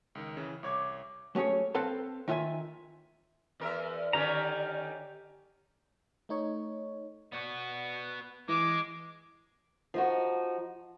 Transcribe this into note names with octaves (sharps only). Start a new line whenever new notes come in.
C#2 D#3
C#3 E3
C2 C#5 D6 G#6
F#3 A3 C#4 G#4 C#5
C4 A4 B4 F5 A5
D#3 F4 E5 F5 G#5
E2 A#4 E5
D3 D#3 C#4 G4 A#5
A3 D#4 C#5
B3 F#4 D5
E3 G#3 D6
F3 D#4 F#4